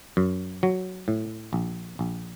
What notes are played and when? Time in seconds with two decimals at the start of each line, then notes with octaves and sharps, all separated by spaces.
0.17 F#2
0.63 F#3
1.08 A2
1.53 A#1
1.99 A#1